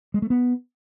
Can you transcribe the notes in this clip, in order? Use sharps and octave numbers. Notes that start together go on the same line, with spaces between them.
G#3
A3
B3